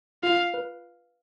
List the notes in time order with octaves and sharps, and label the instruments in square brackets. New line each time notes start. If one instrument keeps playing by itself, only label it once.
[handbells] F4 [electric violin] F5
[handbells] B4